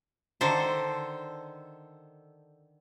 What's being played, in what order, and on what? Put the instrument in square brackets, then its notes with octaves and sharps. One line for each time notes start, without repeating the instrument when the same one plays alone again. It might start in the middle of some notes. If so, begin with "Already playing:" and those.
[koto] D3 D#3 A4 C5